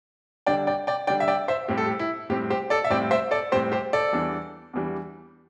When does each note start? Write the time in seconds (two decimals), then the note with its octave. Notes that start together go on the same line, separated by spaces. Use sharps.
0.46 D3 G3 D4 D5 G5
0.67 D5 G5
0.87 D5 G5
1.07 D3 G3 D4 D5 G5
1.20 E5
1.28 D5 G5
1.48 C5 E5
1.68 A2 G3 C4 G4
1.77 A4
1.86 G4
1.99 E4
2.29 A2 G3 C4 G4
2.50 G4 C5
2.70 A4 D5
2.84 E5
2.90 A2 G3 C4 D5 G5
3.11 C5 E5
3.31 A4 D5
3.52 A2 G3 C4 G4 C5
3.72 G4 C5
3.93 A4 D5
4.13 E2 E3 G3 D4
4.73 E2 E3 G3 D4